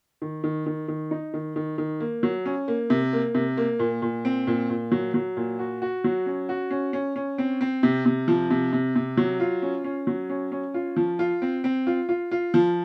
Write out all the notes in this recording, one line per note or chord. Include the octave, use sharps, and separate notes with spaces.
D#3
D#3
D#3
D#3
D#4
D#3
D#3
D#3
A#3
F#3
C#4
A#3
C3
A#3
C3
A#3
A#2
A#2
C4
A#2
A#2
F#3
F#3
A#2
F#4
F#4
F#3
C#4
F#4
C#4
C#4
C#4
C4
C4
C3
C3
F3
C3
C3
C3
F#3
F4
C#4
C#4
F#3
C#4
C#4
F4
F3
F4
C4
C4
F4
F4
F4
F3